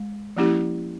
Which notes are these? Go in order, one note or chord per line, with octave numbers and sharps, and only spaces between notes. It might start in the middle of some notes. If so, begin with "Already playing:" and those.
Already playing: G#3
F3 A#3 C#4 E4 G4